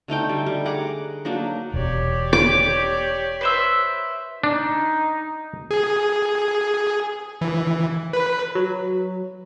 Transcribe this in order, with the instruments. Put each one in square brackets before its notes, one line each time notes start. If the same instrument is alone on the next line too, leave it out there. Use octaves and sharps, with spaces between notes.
[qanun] D3 A3 D#4 G5
G3
G3
G#4 F#5 A#5 D6
F#3 A#3 D4 D#4
[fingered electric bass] E1 [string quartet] G4 C#5 D5
[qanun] D6
[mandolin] B4 C5 E5
[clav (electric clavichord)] D4 [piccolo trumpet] D#4
[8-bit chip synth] G#4
E3
B4
[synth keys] F#3